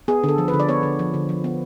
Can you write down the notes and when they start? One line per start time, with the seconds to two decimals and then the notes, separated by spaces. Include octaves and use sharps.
0.08 B3 G#4
0.24 D3 A4
0.38 F3
0.48 B4
0.54 D3
0.60 D5
0.69 B3 C#5
0.83 D3
0.99 F3
1.14 D3
1.29 F3
1.44 B3